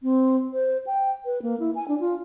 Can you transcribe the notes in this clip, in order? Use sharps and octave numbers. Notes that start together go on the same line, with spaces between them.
C4
C5
G5
B4
A#3
E4
G#5
D4
F4